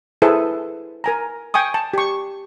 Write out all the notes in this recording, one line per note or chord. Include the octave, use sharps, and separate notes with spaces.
E4 G#4 A4 B4 C5 E5
A#4 G#5 A#5
G5 G#5 C#6 D#6
A5
G4 C#6